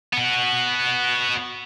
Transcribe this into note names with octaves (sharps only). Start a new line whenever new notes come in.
B3 F#4